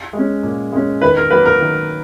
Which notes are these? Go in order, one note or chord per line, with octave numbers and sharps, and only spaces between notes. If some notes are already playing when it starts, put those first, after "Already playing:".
G#3
C#4
A#2
G#3 C#4
D#3 B4
A#4
F#3 A#3 B4
A#4
D#3